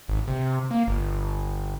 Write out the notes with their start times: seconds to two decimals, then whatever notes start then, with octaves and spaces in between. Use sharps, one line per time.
0.09 G#1
0.27 C3
0.71 A#3
0.87 G1